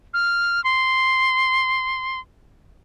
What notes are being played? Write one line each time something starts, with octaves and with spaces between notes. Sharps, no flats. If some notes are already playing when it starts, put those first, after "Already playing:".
F6
C6